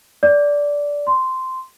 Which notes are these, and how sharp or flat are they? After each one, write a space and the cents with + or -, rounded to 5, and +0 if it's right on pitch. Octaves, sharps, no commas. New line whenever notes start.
D5 -15
C6 -10